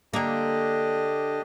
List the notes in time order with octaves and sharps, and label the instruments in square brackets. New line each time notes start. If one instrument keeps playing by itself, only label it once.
[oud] D3 A#3 [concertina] D4 G4 D#5